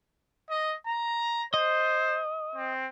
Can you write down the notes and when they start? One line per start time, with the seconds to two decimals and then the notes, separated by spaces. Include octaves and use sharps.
0.50 D#5
0.87 A#5
1.54 C5 D#5
2.55 C4